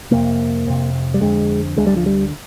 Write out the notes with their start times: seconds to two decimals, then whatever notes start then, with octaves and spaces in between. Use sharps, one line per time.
0.11 F2 C3 A#3
0.67 F2 C3
1.14 G3
1.21 F2 D3 G#3
1.77 D2 D3 G#3
1.87 G3
1.96 F3
2.06 G3